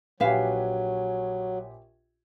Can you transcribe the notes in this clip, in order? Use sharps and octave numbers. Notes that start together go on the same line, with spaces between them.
A#1 F#3 G4 B4 E5 F5 G#5